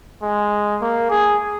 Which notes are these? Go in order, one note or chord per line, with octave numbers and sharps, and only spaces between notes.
G#3
A#3
G#4